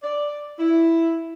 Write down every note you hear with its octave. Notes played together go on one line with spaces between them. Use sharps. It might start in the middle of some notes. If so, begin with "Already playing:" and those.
D5
E4